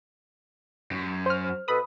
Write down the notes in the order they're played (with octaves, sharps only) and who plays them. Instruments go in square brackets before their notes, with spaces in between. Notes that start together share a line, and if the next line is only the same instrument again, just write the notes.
[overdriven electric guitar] F#2
[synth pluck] C5 F6
[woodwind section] B2 A4 B4 [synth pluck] B5 D#6